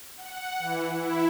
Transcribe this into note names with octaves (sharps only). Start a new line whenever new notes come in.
F#5
E3
E4